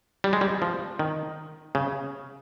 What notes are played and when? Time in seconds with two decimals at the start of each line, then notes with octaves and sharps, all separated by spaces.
0.24 G3
0.33 G#3
0.41 G3
0.62 F3
0.99 D#3
1.75 C#3